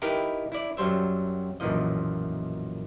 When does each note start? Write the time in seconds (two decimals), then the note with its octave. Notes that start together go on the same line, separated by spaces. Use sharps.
0.02 D#4 E4 G4 A#4 B4 D#5
0.52 E4 D5
0.77 F#2 F#3 G3 C5 E5
1.60 B1 F#2 A#2 E3 F3 D#5